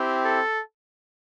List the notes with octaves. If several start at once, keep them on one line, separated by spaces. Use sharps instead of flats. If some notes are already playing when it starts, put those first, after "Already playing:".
Already playing: C4 E4 G4
A4